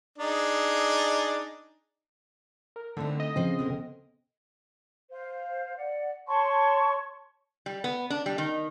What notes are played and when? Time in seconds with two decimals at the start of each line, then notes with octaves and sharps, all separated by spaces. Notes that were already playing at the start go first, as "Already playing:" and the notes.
0.18 D4 D#4 G#4
2.76 A#4
2.97 D3 A3 C4 D#4 E4
3.20 D#5
3.36 C#3 F3 C4 C5
3.59 B2 D3 A#4
5.11 C5 F5
5.76 D5 F#5
6.27 C#5 A5 C6 C#6
7.66 G3
7.84 B3
8.10 D4
8.26 G3
8.38 D#3